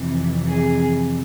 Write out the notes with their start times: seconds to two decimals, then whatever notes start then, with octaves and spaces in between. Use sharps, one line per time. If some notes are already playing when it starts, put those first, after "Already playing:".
Already playing: F2 C3 E3
0.49 G#4